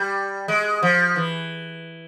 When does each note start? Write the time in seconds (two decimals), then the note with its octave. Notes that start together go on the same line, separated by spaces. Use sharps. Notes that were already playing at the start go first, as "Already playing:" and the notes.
Already playing: G3
0.48 G#3
0.82 F3
1.16 E3